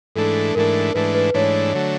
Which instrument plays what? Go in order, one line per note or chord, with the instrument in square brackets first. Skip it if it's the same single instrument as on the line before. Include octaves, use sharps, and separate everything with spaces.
[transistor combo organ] G#2 E3 A3 D4 [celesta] A4
[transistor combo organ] G#2 E3 A3 D4 [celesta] A#4
[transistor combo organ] G#2 E3 A3 D4 [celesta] B4
[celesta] B4
[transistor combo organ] G#2 E3 A3 D4 [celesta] C#5
[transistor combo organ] D3 F#3 A3